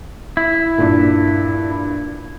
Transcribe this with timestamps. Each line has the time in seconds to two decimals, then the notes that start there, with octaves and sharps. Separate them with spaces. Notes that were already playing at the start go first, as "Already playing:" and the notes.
0.37 E4
0.78 G2 A#2